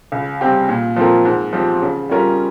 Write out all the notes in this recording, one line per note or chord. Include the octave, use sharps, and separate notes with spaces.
C#2
C3 G3 C4 G4
A#2
F3 C4 F4 A#4
G#2
F3 C4 G4
C#3
G3 C#4 F4 A#4